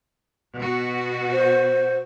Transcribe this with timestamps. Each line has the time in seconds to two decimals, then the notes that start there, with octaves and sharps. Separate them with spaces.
0.58 B2 F#4
1.32 C5